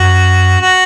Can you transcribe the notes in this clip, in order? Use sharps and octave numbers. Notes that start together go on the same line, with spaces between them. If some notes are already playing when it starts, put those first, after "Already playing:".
Already playing: F#2 F#4
F#4